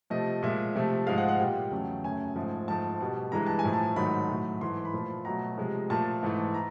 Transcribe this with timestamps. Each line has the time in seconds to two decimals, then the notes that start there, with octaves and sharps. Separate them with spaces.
0.10 C3 F3 A3 D#5
0.43 A#2 F3 G#3 E5
0.76 C3 F3 A3
1.07 G#2 F3 G#3 F5
1.18 F#5
1.28 F#5
1.39 A#2 G3 G5
1.71 E2 C#3 F#3 A3
2.04 F#2 C#3 F#3 A3 G#5
2.36 G#2 F3 A3
2.68 G#2 F3 A3 A5
3.00 B2 G3
3.32 G2 E3 G#3 A#5
3.46 A5
3.59 G#5
3.64 A2 F3 A3
3.73 A5
3.96 G#2 D#3 F#3 A3 B5
4.29 A2 F#3 A3
4.60 G#2 E3 A3 C6
4.77 C6
4.85 B5
4.93 A#2 F3 A3
5.25 B2 F#3 A3 A#5
5.57 C3 F3 G#3
5.90 A#2 F3 A3 A5
6.23 G#2 E3 A3
6.54 A#5